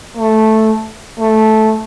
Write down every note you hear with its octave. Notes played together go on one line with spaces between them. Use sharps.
A3
A3